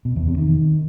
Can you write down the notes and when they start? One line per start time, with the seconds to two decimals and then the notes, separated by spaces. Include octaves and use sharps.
0.05 B2
0.16 E2
0.27 C3
0.38 D#3